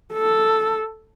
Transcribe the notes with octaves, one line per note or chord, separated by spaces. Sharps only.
A4